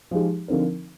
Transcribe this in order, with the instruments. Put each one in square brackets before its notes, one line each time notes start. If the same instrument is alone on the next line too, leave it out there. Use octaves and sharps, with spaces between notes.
[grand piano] F3 G#3 D#4 G4
D3 F3 C4 D#4 A#4